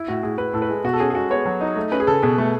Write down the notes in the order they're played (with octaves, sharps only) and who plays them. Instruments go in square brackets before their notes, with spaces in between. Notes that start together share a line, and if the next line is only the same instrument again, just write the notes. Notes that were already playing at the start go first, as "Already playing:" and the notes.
Already playing: [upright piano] E4
[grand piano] A2 [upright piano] F#4
[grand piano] A2 [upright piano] G#4
[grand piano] A2 [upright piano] B4
[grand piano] A2 [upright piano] A4
[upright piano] B4
[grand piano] G#3
[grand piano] B2 [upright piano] F#4
[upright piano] A4
[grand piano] C#4 [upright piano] G#4
[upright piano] G#4
[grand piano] G#3 [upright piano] F#4
[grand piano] B3 [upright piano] C#5
[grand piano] F#3
D#4
A3
[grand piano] C#4 [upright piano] B4
[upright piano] G#4
[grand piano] C#3 [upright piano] A4
[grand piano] B2 [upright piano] G#4
[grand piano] A3